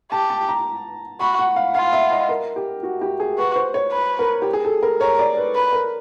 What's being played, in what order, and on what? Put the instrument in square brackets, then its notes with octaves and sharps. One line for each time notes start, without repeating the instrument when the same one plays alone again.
[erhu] G4 [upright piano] A5
[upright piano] A5
A#5
[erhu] F#4 [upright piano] B5
[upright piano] F#5
F5
[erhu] F4 [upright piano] F5
[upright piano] E5
D#5
A#4
G4
F#4
G4
G#4
[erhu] F#4 [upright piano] B4
[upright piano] C5
C#5
[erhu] B4
[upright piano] A#4
G4
G#4
A4
A#4
[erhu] A#4 [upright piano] C#5
[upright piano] D5
B4
[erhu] B4
[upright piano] A#4